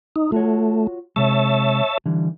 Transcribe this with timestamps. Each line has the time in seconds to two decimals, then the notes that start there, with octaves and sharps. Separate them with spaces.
0.16 D#4
0.32 A3 F4 F#4 C#5
1.16 C3 G#3 C#5 E5 A5
2.06 D3 E3 G3